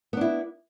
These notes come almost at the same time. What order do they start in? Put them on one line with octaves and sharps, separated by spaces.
B3 D4 E4